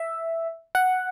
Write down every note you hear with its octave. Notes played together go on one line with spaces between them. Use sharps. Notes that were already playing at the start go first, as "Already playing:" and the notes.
Already playing: E5
F#5